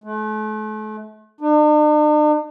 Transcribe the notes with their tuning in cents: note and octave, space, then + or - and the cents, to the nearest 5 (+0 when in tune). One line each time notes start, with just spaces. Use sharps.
A3 -40
D4 +45